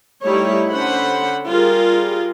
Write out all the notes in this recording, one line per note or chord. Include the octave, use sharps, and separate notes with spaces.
G3 A3 D#4 E4 C#5
D3 C#4 C5 F#5 B5
G3 F4 G#4 A#4